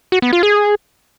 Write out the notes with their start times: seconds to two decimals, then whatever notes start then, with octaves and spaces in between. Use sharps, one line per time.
0.12 F#4
0.22 B3
0.33 F4
0.43 G#4